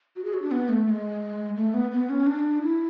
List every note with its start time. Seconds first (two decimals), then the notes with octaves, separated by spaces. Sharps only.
0.16 F#4
0.25 G#4
0.34 F#4
0.42 D4
0.51 B3
0.69 A3
0.86 A3
0.90 G#3
1.56 A3
1.74 B3
1.92 B3
2.10 C#4
2.27 D4
2.62 E4